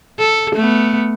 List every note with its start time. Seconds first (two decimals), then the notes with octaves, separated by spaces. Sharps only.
0.19 A4
0.56 A3 B3